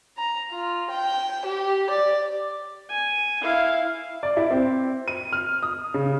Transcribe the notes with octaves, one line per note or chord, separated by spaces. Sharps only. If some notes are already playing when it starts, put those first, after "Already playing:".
A#5
F4
G5
G4
D5
G#5
E4 F5
D5
E4
C4
D#7
F6
D#6
C#3